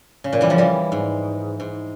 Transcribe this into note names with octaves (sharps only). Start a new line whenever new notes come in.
C#3
A#2
E3 G3
C#3 F3
E3 G3
G#2
G#2